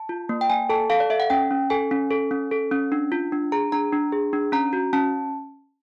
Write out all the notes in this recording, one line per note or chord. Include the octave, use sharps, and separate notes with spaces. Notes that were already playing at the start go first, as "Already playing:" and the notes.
Already playing: A5
F4
A#3
G5
A#3 G#5
A4 A5
A4 F5
D5
A4 E5
F#5
C#4 G5
C#4
A4 G#5
C#4
A4
C#4
A4
C#4
D4
F4
D4
G#4 A#5
D4 A#5
D4
G#4
D4
C#4 A#5
F#4
C#4 A5